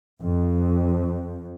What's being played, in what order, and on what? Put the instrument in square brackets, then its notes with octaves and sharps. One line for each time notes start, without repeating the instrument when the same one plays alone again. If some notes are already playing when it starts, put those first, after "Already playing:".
[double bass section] F2